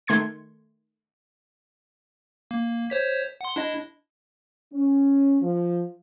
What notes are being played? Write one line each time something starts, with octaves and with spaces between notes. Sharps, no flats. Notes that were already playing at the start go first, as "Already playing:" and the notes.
D#3 A3 C6 G#6 C#7
A#3
C5 C#5 B6
F#5 C6
D4 E4 D#5
C#4
F3